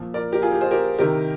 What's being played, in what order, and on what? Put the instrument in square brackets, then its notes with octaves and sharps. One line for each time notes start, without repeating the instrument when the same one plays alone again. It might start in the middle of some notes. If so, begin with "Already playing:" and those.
Already playing: [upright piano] A#2 F3
A#4 D5
G4 A#4
F4 G#4
G4 A#4
G#4 C5
G4 A#4
C3 D#3 G3 G4 A#4